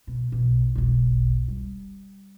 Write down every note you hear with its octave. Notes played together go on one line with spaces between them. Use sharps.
B2
B1 B2
E1 B1
G3